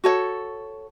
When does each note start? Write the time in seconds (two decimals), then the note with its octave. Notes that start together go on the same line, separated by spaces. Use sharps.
0.04 F#4 A4 C#5